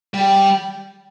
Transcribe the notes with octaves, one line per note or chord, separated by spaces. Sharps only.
G3